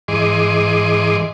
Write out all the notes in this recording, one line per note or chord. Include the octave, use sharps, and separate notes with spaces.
G#2 E3 G#4 D#5 C6 D6